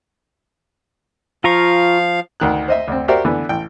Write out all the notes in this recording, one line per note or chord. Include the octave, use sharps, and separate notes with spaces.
F3 F4 F5 A#5 C#6
D2 D#3 F#6
C5 D#5 E5
D2 C4
F#4 G4 A#4 C5 D5 E5
D3 E3 B3
A1 G5